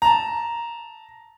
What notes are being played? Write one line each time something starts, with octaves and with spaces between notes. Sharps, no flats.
A5 A#5